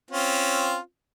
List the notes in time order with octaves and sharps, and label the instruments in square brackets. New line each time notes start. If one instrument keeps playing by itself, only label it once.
[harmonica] C4 C#4 F4